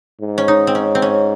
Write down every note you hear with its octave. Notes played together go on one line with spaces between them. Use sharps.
G#2
C#4
D#4
C4
C#4
C4
C#4